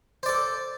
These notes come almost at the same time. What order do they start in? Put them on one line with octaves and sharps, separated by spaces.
C5 D5 A4